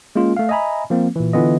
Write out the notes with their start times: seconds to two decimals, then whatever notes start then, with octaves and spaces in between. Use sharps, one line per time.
0.16 G#3 A#3 C#4 F4
0.37 A3 F5
0.49 D#5 E5 G#5 A#5 B5
0.90 F3 A#3 C4
1.16 A#2 E3
1.33 D3 E3 B3 F4 D#5